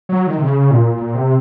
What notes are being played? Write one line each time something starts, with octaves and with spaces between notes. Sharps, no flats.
F#3
D#3
C3
C#3
A#2
A#2
C3